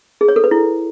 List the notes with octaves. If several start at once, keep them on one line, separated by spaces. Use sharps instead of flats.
G#4
C#5
A4
B4
E4